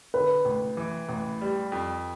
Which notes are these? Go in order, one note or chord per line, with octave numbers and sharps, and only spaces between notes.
D3 B4
A1
E3
A1
G3
F2